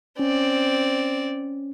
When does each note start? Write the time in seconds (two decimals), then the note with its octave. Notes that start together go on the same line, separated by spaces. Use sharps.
0.19 C4 C#4 D5